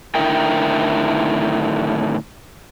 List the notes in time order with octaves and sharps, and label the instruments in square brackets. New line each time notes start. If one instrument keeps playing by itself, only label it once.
[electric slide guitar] A2 D3 D#3 E4 A#4 G5